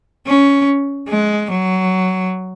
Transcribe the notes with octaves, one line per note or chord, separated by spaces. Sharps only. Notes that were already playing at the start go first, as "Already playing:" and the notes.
C#4
G#3
F#3